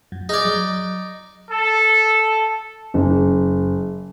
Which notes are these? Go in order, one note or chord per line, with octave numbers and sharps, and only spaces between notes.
F#2
D#4 G#4 D5 F6 G#6
F#3
A4
F#1